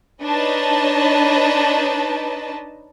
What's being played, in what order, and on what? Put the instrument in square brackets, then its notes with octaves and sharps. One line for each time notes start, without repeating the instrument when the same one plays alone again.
[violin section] D4 D#4 B4 C#5 D#5 A5